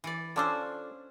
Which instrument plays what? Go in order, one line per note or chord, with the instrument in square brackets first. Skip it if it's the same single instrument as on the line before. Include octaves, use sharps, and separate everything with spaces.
[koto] E3 D5
[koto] C#4 D4 C5 [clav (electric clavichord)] F4 A4 D5